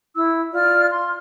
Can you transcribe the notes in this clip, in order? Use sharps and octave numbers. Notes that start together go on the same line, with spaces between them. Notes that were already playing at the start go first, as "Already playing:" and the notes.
E4 E6
F4 D5 F6
C6